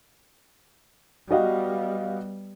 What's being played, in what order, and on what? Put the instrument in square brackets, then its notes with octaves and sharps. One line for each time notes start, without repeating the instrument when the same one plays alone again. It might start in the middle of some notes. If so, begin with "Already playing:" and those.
[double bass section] G3 B3 [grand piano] F#4 D#5 F5